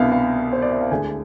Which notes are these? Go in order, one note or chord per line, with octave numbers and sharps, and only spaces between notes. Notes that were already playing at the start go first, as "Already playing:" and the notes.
Already playing: C2 B2 B3 D4 E5 F5
F5
C5
D5
E5
F5
D2 D3 G#3 D4 G#5